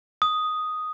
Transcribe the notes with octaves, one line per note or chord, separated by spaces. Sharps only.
D#6